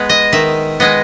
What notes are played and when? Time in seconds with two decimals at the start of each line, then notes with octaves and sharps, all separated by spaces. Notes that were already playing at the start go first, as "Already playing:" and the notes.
Already playing: G#3 B3
0.09 D#5
0.33 D#3 E5
0.80 G#3 B3 D#5